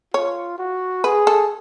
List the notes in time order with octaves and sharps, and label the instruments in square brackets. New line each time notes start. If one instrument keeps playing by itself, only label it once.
[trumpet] F4 [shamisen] C#5
[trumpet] F#4
[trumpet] G#4 [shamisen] B4
[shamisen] A4